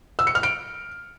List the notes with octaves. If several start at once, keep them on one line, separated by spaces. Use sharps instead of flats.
E6
C#7
F6
D7